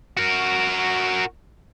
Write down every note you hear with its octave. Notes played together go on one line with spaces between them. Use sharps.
F#4 A#4